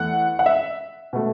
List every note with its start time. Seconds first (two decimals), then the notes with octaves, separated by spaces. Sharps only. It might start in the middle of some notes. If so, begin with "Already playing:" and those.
Already playing: E2 E3 A3 F#5
0.39 F#5
0.46 E5
1.13 B2 A3